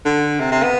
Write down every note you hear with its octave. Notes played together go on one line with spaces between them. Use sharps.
D3
C3
C3
B3